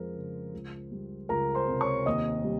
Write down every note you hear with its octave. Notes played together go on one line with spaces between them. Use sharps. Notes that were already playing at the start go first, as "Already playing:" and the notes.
Already playing: F2 F3 G#3 A#4 C5
C#3
C#2
G3
C#2 A#4 A#5
C5 C6
C3
C#5 C#6
D#2 D#5 D#6
G3